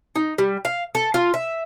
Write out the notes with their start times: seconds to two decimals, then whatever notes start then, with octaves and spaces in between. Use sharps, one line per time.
0.16 D#4
0.38 G3
0.65 F5
0.95 A4
1.14 F4
1.34 E5